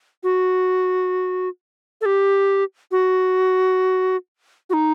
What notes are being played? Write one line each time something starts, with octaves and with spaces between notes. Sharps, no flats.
F#4
A4
G4
F#4
F#4
D#4